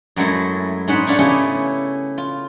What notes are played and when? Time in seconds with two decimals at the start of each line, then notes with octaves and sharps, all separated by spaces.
0.16 F#2 F#3 G#3 A3 E4
0.88 G#2 C#4 D#4 C5 F#5 B5
1.07 A3 C#4 D4 F5 F#5
1.19 C#3 B3 C#4 E4 G4
2.18 F4